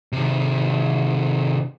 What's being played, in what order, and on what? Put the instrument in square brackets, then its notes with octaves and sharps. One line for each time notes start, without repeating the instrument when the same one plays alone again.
[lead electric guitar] C3 D#3